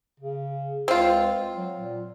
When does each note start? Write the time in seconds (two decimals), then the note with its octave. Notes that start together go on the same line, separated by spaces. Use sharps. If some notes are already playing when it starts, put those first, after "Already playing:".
0.20 C#3
0.88 C#2 C4 F4
1.55 F#3
1.78 A#2